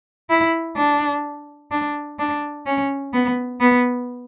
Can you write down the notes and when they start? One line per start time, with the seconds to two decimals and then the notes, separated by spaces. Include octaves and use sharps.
0.30 E4
0.76 D4
1.71 D4
2.19 D4
2.66 C#4
3.13 B3
3.60 B3